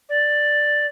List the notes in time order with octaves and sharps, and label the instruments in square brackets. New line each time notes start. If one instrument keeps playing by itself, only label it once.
[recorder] D5